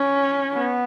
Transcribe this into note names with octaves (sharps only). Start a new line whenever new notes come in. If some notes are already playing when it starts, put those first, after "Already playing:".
Already playing: C#4
B3